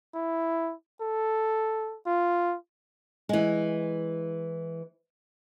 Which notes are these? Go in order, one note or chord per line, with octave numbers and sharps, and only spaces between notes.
E4
A4
F4
E3 G#3